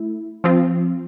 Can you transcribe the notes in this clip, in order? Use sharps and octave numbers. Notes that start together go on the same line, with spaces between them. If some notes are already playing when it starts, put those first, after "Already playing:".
Already playing: A3 E4
F3 C4 F4